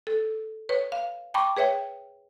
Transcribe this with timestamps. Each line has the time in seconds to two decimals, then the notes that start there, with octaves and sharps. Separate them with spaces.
0.07 A4
0.69 B4 C#5
0.92 F5
1.34 G5 A5 B5 C#6 D6
1.57 G#4 B4 C#5 E5 G5